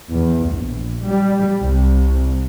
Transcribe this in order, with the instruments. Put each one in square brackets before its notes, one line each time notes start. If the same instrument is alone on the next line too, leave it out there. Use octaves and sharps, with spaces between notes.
[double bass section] E2
A#1
G3
C2